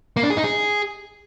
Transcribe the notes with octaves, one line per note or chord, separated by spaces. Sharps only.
A#3
D4
G#4
D#4
G#4